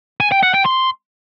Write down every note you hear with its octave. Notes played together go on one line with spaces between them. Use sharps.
G#5
G5
F#5
G5
C6